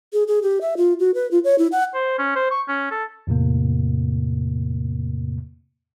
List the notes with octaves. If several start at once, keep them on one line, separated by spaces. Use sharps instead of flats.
G#4
G#4
G4
E5
F4
F#4
B4
F4
C#5
E4
F#5
C5
C#4
C5
C#6
C#4
A4
E2 A2 C3 A#3